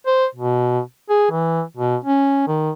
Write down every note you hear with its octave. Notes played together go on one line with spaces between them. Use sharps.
C5
B2
G#4
E3
B2
C#4
D#3